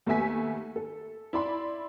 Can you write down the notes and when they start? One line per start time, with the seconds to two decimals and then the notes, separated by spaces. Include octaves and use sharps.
0.06 D#2 A3 B3 E5 G#5 B6
0.76 A4
1.33 E4 D5 B5 C6